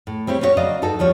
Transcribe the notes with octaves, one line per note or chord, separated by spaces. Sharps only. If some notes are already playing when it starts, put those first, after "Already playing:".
A2
G3 C4 E4 C#5
C#4 D4 E4 F#4 C#5
C#3 F#3 D5 D#5 F5
G2 D#4 F#4 A4
D#2 F3 G3 C#5